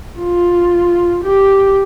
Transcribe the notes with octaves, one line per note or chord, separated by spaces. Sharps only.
F4
G4